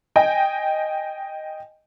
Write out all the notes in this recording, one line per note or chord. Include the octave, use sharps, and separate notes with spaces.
D#5 G5 G#5